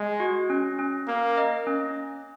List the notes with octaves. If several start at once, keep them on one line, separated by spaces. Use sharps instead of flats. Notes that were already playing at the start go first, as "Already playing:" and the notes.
Already playing: G#3
F#4
C#4
C#4
A#3 A#4
D#5
C#4